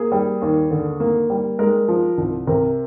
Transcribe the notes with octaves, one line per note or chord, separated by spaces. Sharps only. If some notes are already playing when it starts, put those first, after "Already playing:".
Already playing: A#3 G#4
G3
D#2
D3
A#3
G3
G#3 A#4
F3
C2
C3 A#4